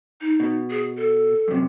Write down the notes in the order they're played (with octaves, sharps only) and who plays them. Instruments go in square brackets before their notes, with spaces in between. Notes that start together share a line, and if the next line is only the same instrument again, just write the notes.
[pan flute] D#4
[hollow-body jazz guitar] B2
[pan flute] G#4
A4
[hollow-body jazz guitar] F#2 C3